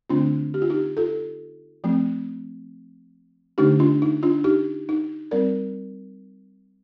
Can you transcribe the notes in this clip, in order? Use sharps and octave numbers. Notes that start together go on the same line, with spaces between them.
D3 A3 C4 D4 F4
G4
F4
D#4 G4
F4 A4
F3 A3 C4
D3 A3 D4 D#4 G4
D4 F4
D#4
D4 F4
D#4 G4
D#4
G3 C4 A#4 D5